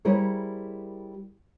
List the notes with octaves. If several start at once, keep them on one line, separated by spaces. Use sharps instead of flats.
G3 E4 G#4 A#4 C5 C#5